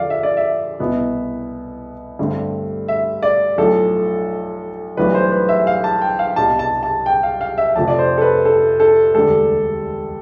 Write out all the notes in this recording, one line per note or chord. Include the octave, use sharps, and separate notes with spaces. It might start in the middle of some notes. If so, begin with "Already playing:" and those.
Already playing: F2 D3 F3 D5 F5
E5
D5
E5
C2 B2 B3 E4
G2 D3 A3 C4
E5
D5
B1 A2 F3 A4
B1 A2 E3 G3 D4 B4
C5
B4
E5
F5
A5
G5
F5
C2 B2 G3 A5
A5
A5
G5
F5
F5
E5
F1 F2 C3 F3 A5
D5
C5
A4
B4
A4
A4
E1 D2 D3 G3 A4